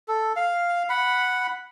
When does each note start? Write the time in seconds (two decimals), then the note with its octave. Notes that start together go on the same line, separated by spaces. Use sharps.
0.08 A4
0.36 F5
0.89 F#5 B5